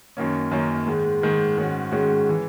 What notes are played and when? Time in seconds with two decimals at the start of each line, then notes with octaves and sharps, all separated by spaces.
0.17 F#2 D#3 A#3 C#4
0.51 F#2 D#3 A#3 C#4
0.87 G#2 D#3 G#3
1.21 G#2 D#3 G#3
1.58 G#2 D#3 G#3 C#4 F#4
1.92 G#2 D#3 G#3 C#4 F#4
2.29 E3